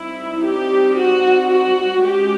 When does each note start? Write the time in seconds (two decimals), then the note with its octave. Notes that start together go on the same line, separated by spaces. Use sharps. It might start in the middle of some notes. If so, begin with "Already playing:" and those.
Already playing: G3 C4 D#4 E4
0.43 G4
0.96 F#4
1.50 F#4
2.03 G#3 C#4 G4